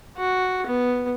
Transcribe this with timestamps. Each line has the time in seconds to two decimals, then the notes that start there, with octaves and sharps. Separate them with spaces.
0.17 F#4
0.66 B3